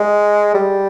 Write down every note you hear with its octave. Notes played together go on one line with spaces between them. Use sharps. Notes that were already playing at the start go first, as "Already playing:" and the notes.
Already playing: G#3
G3